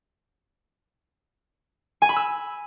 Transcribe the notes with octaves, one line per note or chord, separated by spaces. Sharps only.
G#5
B5
E6